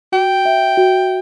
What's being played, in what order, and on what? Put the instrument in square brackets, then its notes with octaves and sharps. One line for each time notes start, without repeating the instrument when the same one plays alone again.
[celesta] F#4 [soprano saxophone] G5
[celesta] E5
F#4